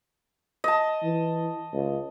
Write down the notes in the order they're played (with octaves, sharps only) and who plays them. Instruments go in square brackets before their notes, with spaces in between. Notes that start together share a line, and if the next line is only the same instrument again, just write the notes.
[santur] D#5 A5
[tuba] E3
C#2